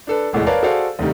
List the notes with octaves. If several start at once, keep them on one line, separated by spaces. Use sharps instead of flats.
D4 A4 B4
F1 E2 A2 G#3
A#4 B4 C#5 D5 F5 A5
F#4 G#4 A4 C5 D5 F5
D2 C3 D#3 G3